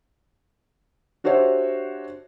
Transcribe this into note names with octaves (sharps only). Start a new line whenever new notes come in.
D4 F#4 G4 C5 C#5 E5